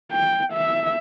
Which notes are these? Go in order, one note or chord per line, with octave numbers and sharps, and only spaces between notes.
G5
E5